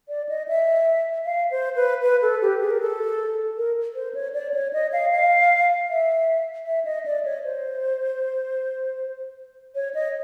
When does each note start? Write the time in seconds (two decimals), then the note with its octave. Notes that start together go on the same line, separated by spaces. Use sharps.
0.09 D5
0.29 D#5
0.48 E5
1.26 F5
1.51 C5
1.76 B4
2.03 B4
2.22 A4
2.42 G4
2.61 G#4
2.71 A#4
2.80 A4
3.57 A#4
3.95 C5
4.14 C#5
4.34 D5
4.54 C#5
4.73 D#5
4.93 F5
5.12 F5
5.90 E5
6.66 E5
6.85 D#5
7.06 D5
7.25 C#5
7.44 C5
9.75 C#5
9.94 D#5